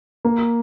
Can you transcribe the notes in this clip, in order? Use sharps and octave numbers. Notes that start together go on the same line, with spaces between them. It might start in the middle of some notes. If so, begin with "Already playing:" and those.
A#3